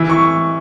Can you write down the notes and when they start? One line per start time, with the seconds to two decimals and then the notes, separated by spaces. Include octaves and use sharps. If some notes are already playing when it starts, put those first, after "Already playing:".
Already playing: E3
0.09 C#6